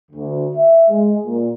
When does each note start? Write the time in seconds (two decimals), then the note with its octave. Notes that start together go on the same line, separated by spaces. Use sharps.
0.11 D2
0.56 E5
0.89 G#3
1.24 A#2